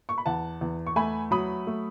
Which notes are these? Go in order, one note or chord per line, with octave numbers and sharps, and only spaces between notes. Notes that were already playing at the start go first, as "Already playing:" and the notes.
C#6
B5
E2 F#5 A5
E2
C#6
A3 G#5 B5
F#3 B5 D#6
A3